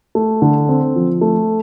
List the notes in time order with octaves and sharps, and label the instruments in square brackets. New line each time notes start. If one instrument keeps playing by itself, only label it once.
[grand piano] A3
D3
C4
F3
A3